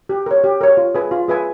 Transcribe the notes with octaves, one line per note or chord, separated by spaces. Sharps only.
G4
A#4 C#5
G4
A#4 C#5
F4
G#4 B4 E5 G#5
F4
G#4 B4 E5 G#5